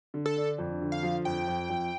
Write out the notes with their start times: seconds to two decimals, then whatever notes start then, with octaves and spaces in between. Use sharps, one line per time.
0.14 D3
0.26 A4
0.37 D4
0.58 F2
0.82 D3
0.92 F5
1.03 F3
1.25 F2 G5
1.48 F2
1.70 F2